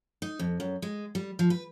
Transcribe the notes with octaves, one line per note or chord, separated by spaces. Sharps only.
D#4
F2
F#2
G#3
G3
F3
B4